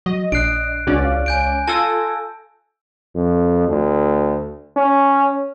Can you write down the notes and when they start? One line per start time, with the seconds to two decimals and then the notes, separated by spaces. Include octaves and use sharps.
0.06 F#3 D#5
0.32 A#1 D4 F#6 C7 D7
0.87 C#2 C#4 D4 F#4 D5
1.05 F5
1.26 G#5 G6 D7
1.68 F4 A4 G#5 A5 E6 A#6
3.16 F2
3.69 D2
4.76 C#4